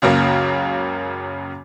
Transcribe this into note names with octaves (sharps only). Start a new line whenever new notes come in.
C#2 F#2 C#3 A#3